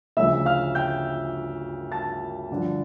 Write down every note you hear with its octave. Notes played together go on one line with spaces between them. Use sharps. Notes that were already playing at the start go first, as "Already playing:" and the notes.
D2 C#3 F3 A3 E5 E6
F5 F6
G5 G6
A5 A6
G2 D3 F3